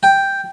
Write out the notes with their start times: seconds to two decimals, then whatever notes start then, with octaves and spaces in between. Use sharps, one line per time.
0.03 G5